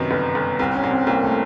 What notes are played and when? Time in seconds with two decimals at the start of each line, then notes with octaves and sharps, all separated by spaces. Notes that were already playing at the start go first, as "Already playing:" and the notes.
Already playing: F#2 C3 D#3 B3
0.11 G1 B3
0.35 G1
0.59 C2 C4
0.75 C#4
0.83 C2
0.91 C4
1.07 C2 A#3
1.24 A3